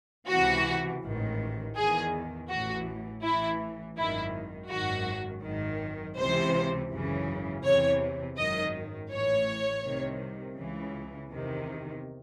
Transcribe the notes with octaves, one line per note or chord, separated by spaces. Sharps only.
C#2 C3 E3 F#4
A1 G#2 D#3
E2 D#3 G#4
A1 A2 E3 F#4
A1 A2 E3 E4
G#1 F#2 D#3 E4
G#1 F#2 D#3 F#4
G#1 F#2 D#3
C#2 C3 E3 C5
G#1 F#2 C#3 E3
E2 C3 E3 C#5
G#1 F#2 D#3 D#5
A1 A2 E3 C#5
C2 C3 D#3
C#2 C#3 E3
E2 C3 D#3